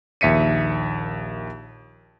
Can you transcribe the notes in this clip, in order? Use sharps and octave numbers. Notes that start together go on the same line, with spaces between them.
A#1 D#2 E5 B6 C#7 D#7